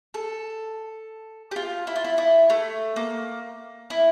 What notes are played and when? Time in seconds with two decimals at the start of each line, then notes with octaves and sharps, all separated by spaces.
0.14 A4
1.51 G4
1.56 F4
1.87 E4
1.96 F4
2.05 E4
2.18 E4
2.50 A3
2.96 A#3
3.90 E4